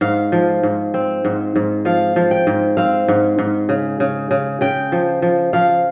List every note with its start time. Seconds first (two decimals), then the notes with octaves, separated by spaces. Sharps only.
0.01 G#2 F5
0.32 F3
0.63 G#2
0.94 C4
1.25 G#2
1.56 G#2
1.85 F3 F5
2.16 F3
2.31 G5
2.47 G#2
2.77 C4 F5
3.08 G#2
3.39 G#2
3.69 C#3
4.00 C#3
4.31 C#3
4.61 C#3 G5
4.92 F3
5.22 F3
5.53 F3 F5